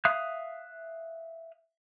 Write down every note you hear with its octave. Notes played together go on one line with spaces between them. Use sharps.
E5 F5 D#6 F#6